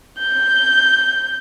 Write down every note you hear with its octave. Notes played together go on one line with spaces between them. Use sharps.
G6